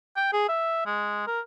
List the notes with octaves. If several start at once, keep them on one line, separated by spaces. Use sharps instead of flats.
G5
G#4
E5
G#3
A#4